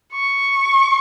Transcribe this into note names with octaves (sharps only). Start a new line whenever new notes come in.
C#6